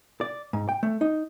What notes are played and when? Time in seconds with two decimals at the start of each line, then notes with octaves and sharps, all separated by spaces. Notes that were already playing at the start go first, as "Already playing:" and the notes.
0.21 D5
0.53 G#2
0.69 G5
0.83 A3
1.01 D#4